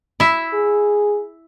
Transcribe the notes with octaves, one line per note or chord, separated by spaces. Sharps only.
E4 E5
G#4